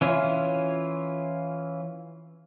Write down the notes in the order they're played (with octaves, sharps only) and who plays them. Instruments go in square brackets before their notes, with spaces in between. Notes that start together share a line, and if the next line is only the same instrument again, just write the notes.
[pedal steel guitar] E3 C#4 E4 F4